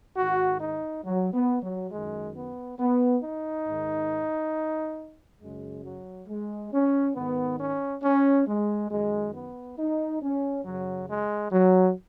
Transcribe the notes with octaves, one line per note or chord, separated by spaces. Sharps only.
G#2 D#3 F#4
D#4
F#3
B3
F#3
F#2 D#3 G#3
B3
B3
D#4
G#2 D#3
F#2 C#3 G#3
F#3
G#3
C#4
G#2 D#3 B3
C#4
C#4
G#3
F#2 D#3 G#3
B3
D#4
C#4
F#2 C#3 F#3
G#3
F#3